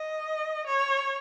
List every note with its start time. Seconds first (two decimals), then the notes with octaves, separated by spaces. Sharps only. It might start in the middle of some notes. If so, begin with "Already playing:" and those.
Already playing: D#5
0.67 C#5